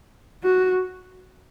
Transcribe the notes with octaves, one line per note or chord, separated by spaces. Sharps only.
F#4